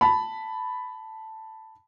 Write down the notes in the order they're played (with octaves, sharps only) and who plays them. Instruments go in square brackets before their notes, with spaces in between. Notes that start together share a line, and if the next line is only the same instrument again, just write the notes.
[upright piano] A5 B5